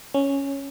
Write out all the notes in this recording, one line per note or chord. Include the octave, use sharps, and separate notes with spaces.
C#4